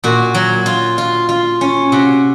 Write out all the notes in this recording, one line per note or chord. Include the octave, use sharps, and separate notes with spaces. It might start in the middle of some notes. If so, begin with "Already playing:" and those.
A#2 F#4
F#3
F4
F4
F4
C#4
C3 F#4